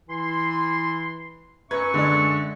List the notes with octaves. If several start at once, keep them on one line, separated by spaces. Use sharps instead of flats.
E3 E4 C6
F#2 B4 E5 A#5 C#6 G#6
D3 G#3 D5